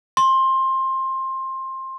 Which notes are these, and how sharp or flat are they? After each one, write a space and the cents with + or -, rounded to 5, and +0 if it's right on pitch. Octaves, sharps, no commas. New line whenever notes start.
C6 +20